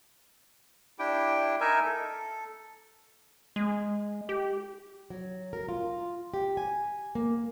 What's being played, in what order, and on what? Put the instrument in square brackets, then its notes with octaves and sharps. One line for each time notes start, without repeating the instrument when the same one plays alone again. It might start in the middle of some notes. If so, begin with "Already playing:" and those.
[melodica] D4 E4 G4 G5
D#4 A#4 E5 G#5
A4
[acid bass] G#3
G4
[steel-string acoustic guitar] F#3
A#4
F4
G4
G#5
A#3